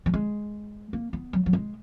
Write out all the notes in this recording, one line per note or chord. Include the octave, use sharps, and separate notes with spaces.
F#3
G#3
A#3
B3
F#3
F#3
G#3